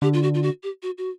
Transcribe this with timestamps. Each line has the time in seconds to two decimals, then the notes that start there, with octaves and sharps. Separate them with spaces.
0.02 D3 G4
0.14 F4
0.23 F#4
0.34 F4
0.43 F#4
0.63 G4
0.83 F#4
0.98 F#4